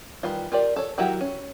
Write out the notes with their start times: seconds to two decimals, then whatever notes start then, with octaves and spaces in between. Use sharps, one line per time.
0.23 D#3 E3 G3 F4
0.52 F4 G4 A#4 D5
0.76 A4 C#5
0.98 D#3 F#3 E4 F#4 G4
1.21 C#4